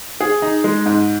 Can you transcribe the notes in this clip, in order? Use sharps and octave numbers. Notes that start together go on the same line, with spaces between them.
G#4
D#4
G#3
G#2